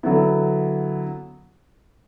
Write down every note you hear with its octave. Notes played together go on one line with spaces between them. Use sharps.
D3 F#3 B3 E4